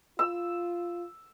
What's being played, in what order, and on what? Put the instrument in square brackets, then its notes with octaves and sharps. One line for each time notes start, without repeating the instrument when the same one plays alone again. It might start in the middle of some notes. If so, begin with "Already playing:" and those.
[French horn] F4 [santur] E6